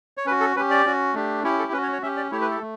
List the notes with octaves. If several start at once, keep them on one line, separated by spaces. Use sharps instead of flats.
C#5
C#4 F#4 B4
A4
C#4 G4 B4
D5
C#4 F#4
A3 D4 G4
C#4 E4 G4 C#5
A4
C#4 F#4 B4
C#5
C#5
C#4 G4 E5
D5
A3 E4 G4 C#5
B4
A4
A3